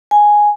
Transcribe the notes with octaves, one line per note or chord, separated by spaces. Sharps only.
G#5